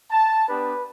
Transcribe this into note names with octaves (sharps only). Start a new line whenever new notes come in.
A5
B3 D4 G4 B4